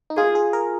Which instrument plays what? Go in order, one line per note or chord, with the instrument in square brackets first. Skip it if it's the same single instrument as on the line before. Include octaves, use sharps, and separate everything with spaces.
[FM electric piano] D#4
[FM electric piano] F4 [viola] G#4
[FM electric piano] G#4
A#4